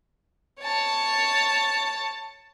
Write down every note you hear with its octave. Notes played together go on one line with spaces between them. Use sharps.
C#5 A5